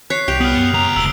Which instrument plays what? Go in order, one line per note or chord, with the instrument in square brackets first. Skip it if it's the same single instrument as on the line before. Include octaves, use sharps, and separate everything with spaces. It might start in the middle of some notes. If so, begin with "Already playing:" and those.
[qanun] C#5 [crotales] F#6 B6 C7
[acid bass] C2 [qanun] G4 [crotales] C7 D7 F7
[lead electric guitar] B3 [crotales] D#6 F6
[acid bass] F#2
[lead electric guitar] C#2 A#5
[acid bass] D#1 [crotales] E6 D7 G7